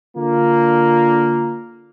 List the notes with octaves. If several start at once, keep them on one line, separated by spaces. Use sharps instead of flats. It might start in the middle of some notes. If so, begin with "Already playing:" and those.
D3 A#3 F4